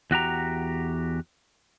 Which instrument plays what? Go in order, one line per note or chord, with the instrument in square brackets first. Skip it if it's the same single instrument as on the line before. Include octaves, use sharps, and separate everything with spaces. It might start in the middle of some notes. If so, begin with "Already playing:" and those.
[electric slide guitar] E2 F#4 G4 A#5